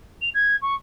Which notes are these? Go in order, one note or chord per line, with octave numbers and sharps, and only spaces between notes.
F7
G#6
C#6